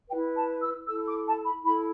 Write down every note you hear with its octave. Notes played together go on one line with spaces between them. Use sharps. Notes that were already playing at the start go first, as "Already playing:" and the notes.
E4 B4 G5
A5
E6
E4 A4 E6
D6
A5
B5
E4 A4 B5